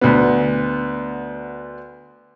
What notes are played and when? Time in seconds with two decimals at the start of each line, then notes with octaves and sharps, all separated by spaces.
0.01 D2 B3